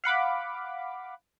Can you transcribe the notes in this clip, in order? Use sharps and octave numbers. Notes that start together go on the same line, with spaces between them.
F5 F#5 B5 D6